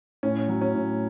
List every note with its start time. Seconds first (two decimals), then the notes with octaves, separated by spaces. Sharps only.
0.23 A2 C#4
0.48 F#3
0.61 C#4
0.74 A2